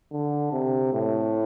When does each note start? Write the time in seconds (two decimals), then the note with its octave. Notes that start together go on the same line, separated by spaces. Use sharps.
0.11 D3
0.52 C3
0.93 A2